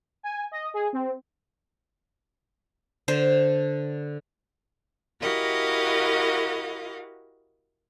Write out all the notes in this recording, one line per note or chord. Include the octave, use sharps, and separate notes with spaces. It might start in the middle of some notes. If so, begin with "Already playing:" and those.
G#5
D#5
G#4
C4
D3 C5
E4 F#4 G4 A#4 D#5 F5